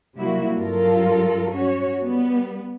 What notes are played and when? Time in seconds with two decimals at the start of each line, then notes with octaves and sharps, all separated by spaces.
0.17 C3 F#3 G3 A#3 E4 F#4
0.56 G2 F#3 F4 A4 A#4
1.50 C#4 F#4 C#5
1.98 G3 B3